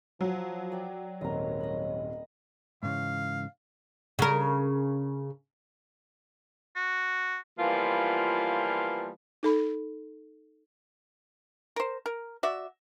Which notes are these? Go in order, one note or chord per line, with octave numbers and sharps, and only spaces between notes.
F3 F#3
D5 G5
D#1 G#1 A#4 C#5 D#5
D#5 B5
G#2 C#3 E3 F5
C#3 A#4
F#4
E3 F3 G3 A#3 B3 F4
D#4 A4 B5
A#4 C5
A#4
F#4 D5 E5